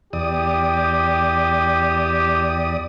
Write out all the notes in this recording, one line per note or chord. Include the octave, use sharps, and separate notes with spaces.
E2 G4 D5 D#6